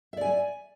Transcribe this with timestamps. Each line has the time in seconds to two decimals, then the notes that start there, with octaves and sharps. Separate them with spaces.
0.13 E5
0.17 D5
0.21 G#5